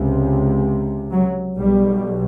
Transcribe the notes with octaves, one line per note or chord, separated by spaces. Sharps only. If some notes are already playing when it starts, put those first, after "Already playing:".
Already playing: C#2 C3
F#3
B1 B2 G3